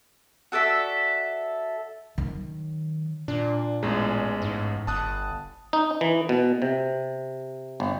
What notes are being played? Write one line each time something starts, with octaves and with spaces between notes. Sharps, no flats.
F#4 A4 D5 E5
D#3 F#3
A#2 D4
A1 E2 G#3
G#2
G1 A5 D#6 F#6
D#4
E3
B2
C3
G1